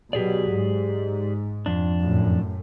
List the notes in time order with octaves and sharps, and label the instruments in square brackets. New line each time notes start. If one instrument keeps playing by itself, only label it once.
[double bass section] B2 F#3 [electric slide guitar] G4 G#4 D5
[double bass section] G#2
[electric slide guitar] F2 D4
[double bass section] F#2 A2